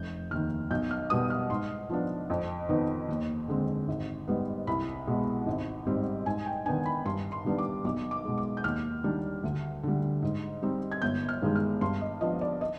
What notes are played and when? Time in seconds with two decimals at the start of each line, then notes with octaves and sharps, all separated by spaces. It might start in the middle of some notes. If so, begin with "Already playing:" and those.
Already playing: F1 G6
0.31 D#2 D#3 F6
0.70 B1 G6
0.91 F6
1.10 B2 G3 B3 D#6
1.30 F6
1.50 G#2 C6
1.90 F3 B3 D4
2.30 F2
2.69 D#3 B3 D#4
3.08 D#2
3.48 D3 G#3 C4
3.88 G#1
4.28 G#2 G3 B3
4.67 C2 B5
5.07 B2 G#3
5.46 G#1
5.87 G#2 G3 C4
6.26 G#2 G#5
6.46 G5
6.66 D#3 B3 D4 G#5
6.86 B5
7.05 G2 C6
7.32 C6
7.45 D#3 G3 B3 D4
7.58 D6
7.84 B1 D6
8.11 D6
8.25 B2 G#3
8.38 D6
8.57 G6
8.64 D#2 F6
9.04 D#3 G3 D4
9.43 D2
9.83 D3 G3
10.22 G#2
10.62 G3 C4 D#4
10.92 G#6
11.02 G1 G6
11.29 F6
11.42 G2 D#3 G#3
11.56 F6
11.81 G2 C6
12.01 D#5
12.21 F3 B3 D4 D#5
12.41 D5
12.61 D#5